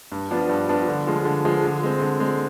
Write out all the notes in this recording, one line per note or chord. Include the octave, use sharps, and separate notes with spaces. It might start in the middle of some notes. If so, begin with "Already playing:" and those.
G2
F3 B3 D4
G2
F3 B3 D4
D3
F3 G#3
D3
F3 G#3
D3
G#3 C4
D3
G#3 C4